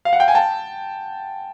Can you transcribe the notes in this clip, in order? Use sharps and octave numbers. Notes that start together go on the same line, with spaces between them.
F5
F#5
G5
G#5
G5 A5